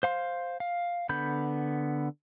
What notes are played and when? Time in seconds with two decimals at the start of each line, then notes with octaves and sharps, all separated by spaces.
0.03 C5 F5 C6
0.60 F5
1.09 D3 B3 B5 G6